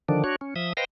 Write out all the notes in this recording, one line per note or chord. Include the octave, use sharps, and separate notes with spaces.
D3 D#3 F3 D4
D4 F#4 C#5
C#4
F3 E5 D#6
B4 C5 D#5 F5 G5 A#6